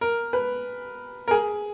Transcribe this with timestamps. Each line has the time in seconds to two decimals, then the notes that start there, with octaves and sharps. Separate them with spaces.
0.01 A#4
0.33 B4
1.28 A#4
1.31 G#4